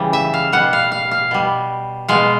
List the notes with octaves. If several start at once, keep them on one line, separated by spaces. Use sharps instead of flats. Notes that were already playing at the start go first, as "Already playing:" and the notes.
Already playing: C#3 E3 G3
E5
F5
B2 G3 F#5
F5
F5
F5
B2 G3
B2 G#3 F5